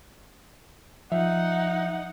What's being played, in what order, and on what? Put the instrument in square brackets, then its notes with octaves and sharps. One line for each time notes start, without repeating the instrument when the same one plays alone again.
[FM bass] F3 [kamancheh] D#4 F#5 [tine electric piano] E5